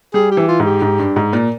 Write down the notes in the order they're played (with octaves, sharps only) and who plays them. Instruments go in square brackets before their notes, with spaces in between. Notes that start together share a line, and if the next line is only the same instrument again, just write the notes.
[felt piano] G3 [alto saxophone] G#4
[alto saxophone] G4
[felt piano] E3
[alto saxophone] F4
[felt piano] G#2
[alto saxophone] G4
[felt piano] G#2
G2
G#2
A#2